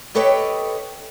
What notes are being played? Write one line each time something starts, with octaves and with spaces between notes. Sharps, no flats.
G4 A4 B4 C#5 D#5 G5